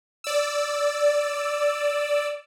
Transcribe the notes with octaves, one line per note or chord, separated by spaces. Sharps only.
D5 E6